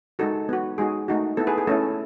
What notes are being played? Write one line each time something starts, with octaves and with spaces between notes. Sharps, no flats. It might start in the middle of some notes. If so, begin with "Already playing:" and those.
G#3 D#4 F#4 A4
B3 F#4
G#3 D#4 F#4 G#4
A3 D#4 F#4
B3 E4 A4
G#4 B4
G#4
A3 C#4 E4 A4